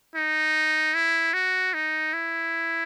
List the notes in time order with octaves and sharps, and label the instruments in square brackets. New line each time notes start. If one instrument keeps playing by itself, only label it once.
[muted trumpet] D#4
E4
F#4
D#4
E4